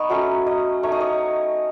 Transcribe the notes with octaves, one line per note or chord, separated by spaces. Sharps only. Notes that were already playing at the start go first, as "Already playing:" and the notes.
Already playing: B3 D#4 B5 C#6 D#6
F#3 A3 C#4
D#5
A3 D#4 C#5
D#5
C#5